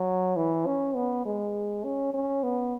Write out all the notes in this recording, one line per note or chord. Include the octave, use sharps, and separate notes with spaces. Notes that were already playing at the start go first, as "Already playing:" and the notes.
Already playing: F#3
E3
C#4
B3
G#3
C#4
C#4
B3